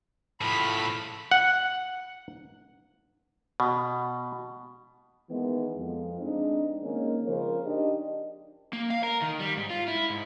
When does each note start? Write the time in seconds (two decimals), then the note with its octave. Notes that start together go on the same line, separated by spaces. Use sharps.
0.41 A2 F3 B5
1.31 F#5
3.60 B2
5.29 D#3 E3 G#3 B3
5.77 F2
6.20 G#3 C4 D4 D#4
6.81 D#3 G#3 A#3 C4 C#4
7.26 C#3 F3 A#4 C5
7.65 D4 D#4 G4 D#5
8.73 A#3
8.90 F5
9.04 A#4
9.22 D#3
9.40 G3
9.57 G#2
9.70 F4
9.88 E4
10.09 G#2